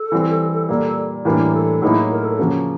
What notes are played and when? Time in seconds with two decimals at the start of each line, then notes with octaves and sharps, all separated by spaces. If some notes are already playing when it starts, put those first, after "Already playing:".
Already playing: A4
0.12 E3 G3 C4
0.69 A#2 G3 A#3 A4
1.25 A2 E3 G3 A#3 D4 A#4
1.54 A4
1.82 A2 F#3 A#3 D#4 E4 G#4
2.11 A#4
2.24 A4
2.39 C#3 F3 A#3 C#4 F#4